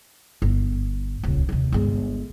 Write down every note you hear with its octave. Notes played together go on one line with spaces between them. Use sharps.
G1
D#1 C#2
D#2 C3
G1 G#3